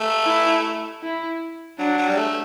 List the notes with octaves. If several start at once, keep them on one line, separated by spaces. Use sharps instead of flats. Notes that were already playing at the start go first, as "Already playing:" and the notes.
Already playing: A3
E4
E4
F#3 D4
F#3
G3
A3